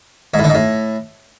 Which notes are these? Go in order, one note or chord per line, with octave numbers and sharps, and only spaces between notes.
G#2
A2
D3
G#2
A2